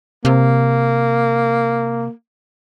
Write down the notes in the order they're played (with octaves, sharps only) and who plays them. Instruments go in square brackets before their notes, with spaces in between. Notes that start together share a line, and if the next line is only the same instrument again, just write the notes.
[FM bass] C3 [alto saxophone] A#3